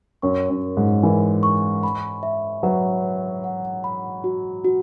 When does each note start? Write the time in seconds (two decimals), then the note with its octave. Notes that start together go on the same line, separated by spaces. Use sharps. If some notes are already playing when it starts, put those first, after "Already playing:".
0.22 F#2 C#6
0.50 F#2
0.64 A#4
0.77 G#2
1.03 E3 A#4
1.43 C#6
1.83 B5
2.23 E5
2.63 F#3 B4
3.03 B4
3.44 F#5
3.84 B5
4.24 F#4
4.65 F#4